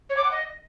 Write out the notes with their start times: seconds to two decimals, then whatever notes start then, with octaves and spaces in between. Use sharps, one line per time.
0.09 C#5
0.17 D6
0.24 F#5
0.31 D#5